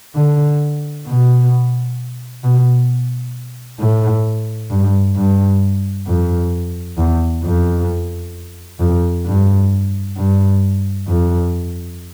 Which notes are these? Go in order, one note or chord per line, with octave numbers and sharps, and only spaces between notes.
D3
B2
B2
A2
G2
G2
F2
E2
F2
F2
G2
G2
F2